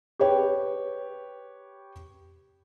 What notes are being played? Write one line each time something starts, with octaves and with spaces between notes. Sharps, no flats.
G4 B4 C#5 G5